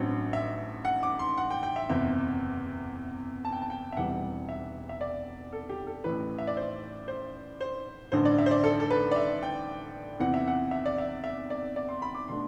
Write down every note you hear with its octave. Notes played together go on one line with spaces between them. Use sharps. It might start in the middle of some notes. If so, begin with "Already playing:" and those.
Already playing: A1 G2 F#3 C4
E5
F#5
D6
C6
F#5
G5
G5
E5
F#1 E2 C3 E5
A5
G5
A5
G5
E5
E1 E2 C3 E3 G3 F#5
E5
E5
D5
A4
G4
A4
A1 A2 E3 B4
E5
D5
C5
C5
C5
A1 G2 D3 C5
D5
E5
C5
D5
A4
A4
B4
D5
E5
G5
E2 C3 E3 F#5
E5
F#5
E5
D5
E5
E5
D5
D5
C6
B5
D6
B2 A3 D4 C6